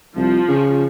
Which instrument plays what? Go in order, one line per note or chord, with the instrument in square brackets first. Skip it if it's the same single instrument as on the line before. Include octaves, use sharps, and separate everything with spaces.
[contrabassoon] C2 [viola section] F3
[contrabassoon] C#3